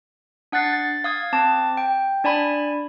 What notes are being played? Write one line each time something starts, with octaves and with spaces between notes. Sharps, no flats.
D4 F#5 F#6 A6 C7
A6
F5 D#6 G#6
C4 A5 D6
G5
D4 D5 G#5 B5